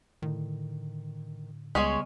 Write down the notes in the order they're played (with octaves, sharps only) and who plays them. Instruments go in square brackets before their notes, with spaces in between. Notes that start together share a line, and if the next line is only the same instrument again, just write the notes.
[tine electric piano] A2 D3 [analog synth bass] D#3
[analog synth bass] C#2 [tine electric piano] C#3 G3 B3 [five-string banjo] G#3 [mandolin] C#4 C#5 C6